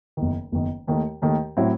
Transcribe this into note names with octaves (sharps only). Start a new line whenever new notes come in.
F#1 E2 D#3
F#1 E2 D#3
D#2 D#3 A3
D#2 D#3 A3
A2 F#3 C4 E4